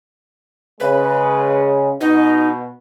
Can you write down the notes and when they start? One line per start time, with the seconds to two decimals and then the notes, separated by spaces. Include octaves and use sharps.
0.80 C#3 G#3 B4
2.01 B2 D#4